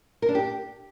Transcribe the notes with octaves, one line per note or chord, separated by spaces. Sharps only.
A#4
D4
G4